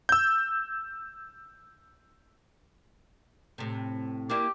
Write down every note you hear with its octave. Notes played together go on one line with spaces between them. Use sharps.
E6 G6
A2 C3
A#3 D4 E4 G4